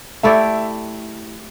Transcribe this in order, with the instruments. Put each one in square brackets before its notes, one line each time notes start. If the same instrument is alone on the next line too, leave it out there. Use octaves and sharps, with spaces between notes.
[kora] A3 E4 G4 D5 [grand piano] E5